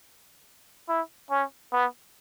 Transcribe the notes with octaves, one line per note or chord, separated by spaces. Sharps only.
E4
C#4
B3